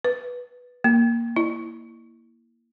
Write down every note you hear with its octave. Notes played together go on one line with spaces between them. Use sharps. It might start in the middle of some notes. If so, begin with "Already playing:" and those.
B4
A#3
E4